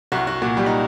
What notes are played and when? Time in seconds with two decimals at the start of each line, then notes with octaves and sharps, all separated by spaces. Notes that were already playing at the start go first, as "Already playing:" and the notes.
0.12 C2 F#4
0.27 F#4
0.42 A#2 F#4
0.57 G3 G4
0.66 D#4